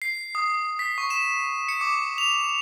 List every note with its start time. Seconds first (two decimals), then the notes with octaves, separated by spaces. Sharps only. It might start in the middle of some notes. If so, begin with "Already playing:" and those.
0.02 C7
0.35 D#6
0.79 B6
0.98 C#6
1.10 E7
1.69 C#7
1.81 D6
2.18 F7